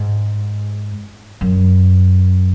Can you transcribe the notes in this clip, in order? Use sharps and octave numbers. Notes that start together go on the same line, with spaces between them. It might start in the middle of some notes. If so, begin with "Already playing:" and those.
Already playing: G#2
F#2